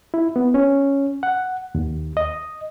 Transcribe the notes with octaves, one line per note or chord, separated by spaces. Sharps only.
E4
B3
C#4
F#5
D#2
D#5